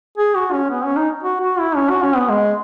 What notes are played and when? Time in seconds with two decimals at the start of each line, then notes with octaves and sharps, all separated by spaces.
0.18 G#4
0.35 F#4
0.53 C#4
0.70 B3
0.84 C#4
0.96 D#4
1.23 F#4
1.41 F#4
1.60 E4
1.76 C#4
1.90 F#4
2.03 C#4
2.17 B3
2.29 G#3